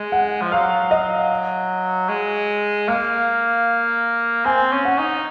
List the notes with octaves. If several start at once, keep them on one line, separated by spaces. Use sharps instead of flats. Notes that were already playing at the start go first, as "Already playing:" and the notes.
Already playing: G#3
F#5
F3
F#3 F5
D#5
G#3
A#3 F5
C4 G#5
C#4
F#5
D#4